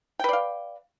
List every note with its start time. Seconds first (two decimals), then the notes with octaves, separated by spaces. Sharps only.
0.19 G5
0.24 B4
0.29 D5
0.33 F5